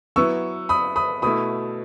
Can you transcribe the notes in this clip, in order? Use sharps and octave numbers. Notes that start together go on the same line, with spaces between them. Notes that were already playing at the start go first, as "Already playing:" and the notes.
F#3 B3 E4 C#6 E6
B5 D#6
B5 D#6
B2 A3 E4 B5 D#6